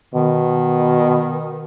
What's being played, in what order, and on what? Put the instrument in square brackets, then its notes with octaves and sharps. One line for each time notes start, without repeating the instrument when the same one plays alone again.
[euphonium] B2 [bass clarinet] D#3